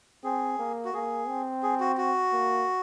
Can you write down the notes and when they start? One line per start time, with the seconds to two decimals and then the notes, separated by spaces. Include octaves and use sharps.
0.24 C4 G#4
0.59 A#3
0.85 F#4
0.93 A#3 G#4
1.28 C4
1.63 G#4
1.80 F#4
1.97 F#4
2.33 A#3